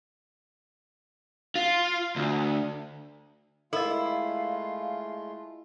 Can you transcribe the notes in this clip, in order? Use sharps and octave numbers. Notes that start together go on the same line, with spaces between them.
F4
D2
G#3 A3 E4 F4 A4 A#4 D#5 F5